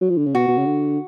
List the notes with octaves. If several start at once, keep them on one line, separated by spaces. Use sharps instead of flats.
F#3
F3
D3
C#3
B2 F#4
B2
C#3
D3